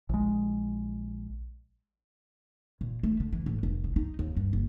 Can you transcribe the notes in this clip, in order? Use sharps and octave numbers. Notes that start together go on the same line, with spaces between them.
A#1 G#3
A#2
A3
D3
E3
A2
F1
C2
D#4
D#2
G2
F#1